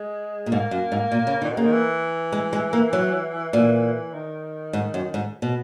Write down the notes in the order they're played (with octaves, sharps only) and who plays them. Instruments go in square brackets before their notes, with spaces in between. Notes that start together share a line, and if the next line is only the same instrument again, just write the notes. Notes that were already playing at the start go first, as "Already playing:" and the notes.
Already playing: [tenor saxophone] G#3
[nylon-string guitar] A#2
[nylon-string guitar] G#2 [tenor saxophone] A#3
[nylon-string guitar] F#2
G#2
A#2
C#3
[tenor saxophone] A#2 [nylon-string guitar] D#3
[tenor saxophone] B2
[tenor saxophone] C#3 [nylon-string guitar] A#3
[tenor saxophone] D#3
E3
[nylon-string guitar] G#3
G#3
A#3
F#3
A#2
[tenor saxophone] D#3
[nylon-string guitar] G#2
F#2
G#2
B2